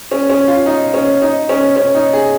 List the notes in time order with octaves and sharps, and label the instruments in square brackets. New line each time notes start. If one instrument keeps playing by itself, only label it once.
[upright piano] C#4
C#4
F4
D#4
C#4
D#4
C#4
C#4
D#4
G#4